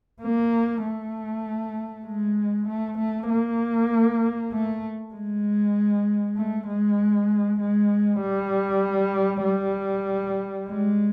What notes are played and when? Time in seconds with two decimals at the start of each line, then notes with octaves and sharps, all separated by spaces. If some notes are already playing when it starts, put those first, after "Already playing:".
0.22 A#3
0.84 A3
2.06 G#3
2.68 A3
2.99 A3
3.29 A#3
4.53 A3
5.14 G#3
6.37 A3
6.68 G#3
7.60 G#3
8.21 G3
9.44 G3
10.67 G#3